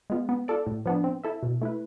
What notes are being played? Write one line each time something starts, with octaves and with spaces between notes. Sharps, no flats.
G#3 B3 F4
B3
F4 A4 D5
A2
F3 B3 D4
C4
E4 A4 E5
B2
A3 E4 B4